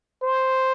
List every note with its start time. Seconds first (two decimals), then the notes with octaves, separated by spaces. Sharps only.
0.22 C5